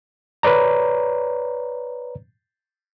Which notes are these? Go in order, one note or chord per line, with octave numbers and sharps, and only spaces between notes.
B4 C#5 D5 A#5